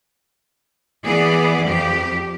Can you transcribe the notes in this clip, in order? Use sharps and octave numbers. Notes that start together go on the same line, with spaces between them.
E3 B3 G#4 D5
F2 F3 G4